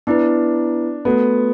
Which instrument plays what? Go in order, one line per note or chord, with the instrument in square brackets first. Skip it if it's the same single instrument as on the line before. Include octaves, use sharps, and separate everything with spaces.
[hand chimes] B3 E4 B4 [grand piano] D4
[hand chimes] A3 F#4 A4 [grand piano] B3